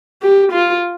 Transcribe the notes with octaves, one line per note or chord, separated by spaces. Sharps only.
G4
F4